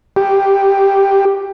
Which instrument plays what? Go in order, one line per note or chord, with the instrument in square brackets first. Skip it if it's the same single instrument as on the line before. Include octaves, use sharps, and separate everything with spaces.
[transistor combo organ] G4